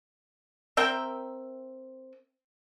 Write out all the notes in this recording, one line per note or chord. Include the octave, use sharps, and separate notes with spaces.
C4 A#4 E5 G5